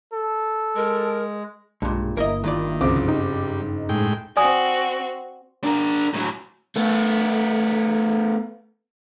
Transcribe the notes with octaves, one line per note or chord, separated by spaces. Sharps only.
A4
G#3 A#4
B1 G2 A#2 G#3
G1 A#3 E4 A#4 D#5
G2 D#3 F4 D5
F#1 C2 F3 C4 D6
G3 D#4
A2 G#3 G5
C4 F#4 D5 G#5 D#6
D4 A#4
A2 F#3
A3 B3